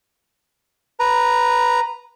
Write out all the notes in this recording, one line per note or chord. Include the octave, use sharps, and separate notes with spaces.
B4 A#5